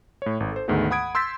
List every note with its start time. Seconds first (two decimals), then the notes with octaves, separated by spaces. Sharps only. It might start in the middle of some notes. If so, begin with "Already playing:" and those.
0.22 A2 C#5
0.40 G#1
0.52 A4 C5
0.68 D2 G#2 D#3 G#3 A3 B3
0.91 F#5 B5 D#6 G#6 D7
1.15 C6 E6 G6 A6 B6